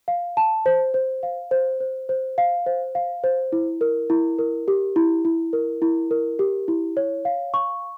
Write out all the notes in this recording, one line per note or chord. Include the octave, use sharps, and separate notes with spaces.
F5
A5
C5
C5
F5
C5
C5
C5
F5
C5
F5
C5
E4
A#4
E4
A#4
G4
E4
E4
A#4
E4
A#4
G4
E4
C#5
F5
C#6